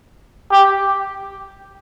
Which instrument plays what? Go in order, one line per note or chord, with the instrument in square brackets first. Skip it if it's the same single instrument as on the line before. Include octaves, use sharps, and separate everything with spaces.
[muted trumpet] G4